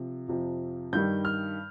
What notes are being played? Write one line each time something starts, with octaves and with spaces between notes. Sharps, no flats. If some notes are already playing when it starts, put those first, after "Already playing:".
Already playing: C3 F3
F2 C3 F3
G2 D#3 G3 G6
F6